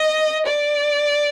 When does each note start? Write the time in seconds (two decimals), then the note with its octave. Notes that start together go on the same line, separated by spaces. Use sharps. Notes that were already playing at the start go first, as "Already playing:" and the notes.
Already playing: D#5
0.46 D5